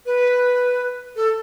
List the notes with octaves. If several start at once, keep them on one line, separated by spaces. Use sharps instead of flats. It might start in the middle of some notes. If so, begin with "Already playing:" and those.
B4
A4